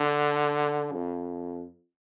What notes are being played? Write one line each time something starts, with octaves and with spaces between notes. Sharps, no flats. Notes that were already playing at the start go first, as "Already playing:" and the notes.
Already playing: D3
F2